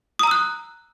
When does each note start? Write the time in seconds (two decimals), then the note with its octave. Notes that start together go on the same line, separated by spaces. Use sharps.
0.19 D#6
0.23 A#5
0.27 E6
0.31 F#6